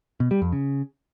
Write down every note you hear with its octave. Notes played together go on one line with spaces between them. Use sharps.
B2
G3
F2
C#3